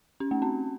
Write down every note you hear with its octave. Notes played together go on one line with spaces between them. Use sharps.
C#4
A3
C4